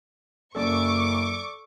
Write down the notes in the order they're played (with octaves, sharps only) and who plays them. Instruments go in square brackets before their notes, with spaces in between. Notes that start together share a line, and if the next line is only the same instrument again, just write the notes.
[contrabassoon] F#1 [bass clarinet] F#2 [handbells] A4 D5 E6 [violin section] C#6 D6